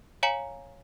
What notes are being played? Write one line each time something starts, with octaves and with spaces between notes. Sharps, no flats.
C#5 F5 G#5 A#5 C#7 F#7